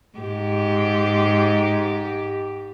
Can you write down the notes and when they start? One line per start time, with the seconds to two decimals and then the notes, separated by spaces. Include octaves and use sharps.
0.19 G#2 G4